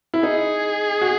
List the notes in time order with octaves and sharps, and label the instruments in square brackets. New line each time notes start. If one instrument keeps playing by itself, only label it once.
[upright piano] E4
[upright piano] D#4 [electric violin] G#4
[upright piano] F#4